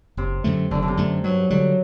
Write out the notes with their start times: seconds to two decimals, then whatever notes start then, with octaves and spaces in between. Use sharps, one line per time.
0.17 F#1 C3
0.44 F#2 D3 A3
0.71 F#1 D3
0.82 D3
0.88 C3
0.97 F#2 D3 A3
1.24 G2 F#3
1.50 D3 F#3 G3